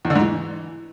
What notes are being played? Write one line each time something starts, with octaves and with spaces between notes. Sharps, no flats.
E2
D3
G#2
E3